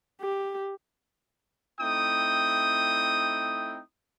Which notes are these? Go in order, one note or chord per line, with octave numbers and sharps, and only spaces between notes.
G4
A3 C4 D#4 E4 G5 D#6